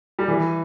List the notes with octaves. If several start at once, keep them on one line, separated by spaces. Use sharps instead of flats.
G3
E3